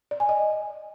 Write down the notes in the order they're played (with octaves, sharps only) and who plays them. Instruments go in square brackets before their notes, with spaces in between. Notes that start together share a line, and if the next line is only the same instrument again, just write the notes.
[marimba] D5
G#5
D#5